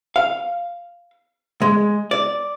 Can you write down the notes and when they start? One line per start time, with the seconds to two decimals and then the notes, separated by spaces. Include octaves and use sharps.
0.16 F5
1.62 G#3
2.11 D5